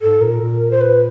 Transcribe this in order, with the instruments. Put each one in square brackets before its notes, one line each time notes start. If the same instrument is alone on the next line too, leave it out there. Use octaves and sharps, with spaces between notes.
[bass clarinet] G#2 [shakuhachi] A4
[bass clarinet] A#2 [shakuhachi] A#4
[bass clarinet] A#2
[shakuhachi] C5
B4